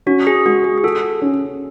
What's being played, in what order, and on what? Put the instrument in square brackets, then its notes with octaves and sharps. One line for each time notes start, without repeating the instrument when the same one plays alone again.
[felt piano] C#4 [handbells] F#4
[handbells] G#4
[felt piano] G#3 [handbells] F#4
[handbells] G#4
G#4
[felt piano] F#4 [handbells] A4
[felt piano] C#4